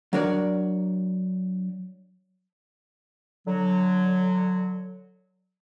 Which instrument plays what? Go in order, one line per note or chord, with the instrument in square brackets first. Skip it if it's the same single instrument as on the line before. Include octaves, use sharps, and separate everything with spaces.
[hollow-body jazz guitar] F#3 D4 A#4 C#5 D5
[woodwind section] D3 F#3